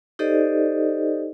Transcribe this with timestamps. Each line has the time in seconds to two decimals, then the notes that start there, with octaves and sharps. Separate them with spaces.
0.19 D#4 G4 A4 C5 D5 D#5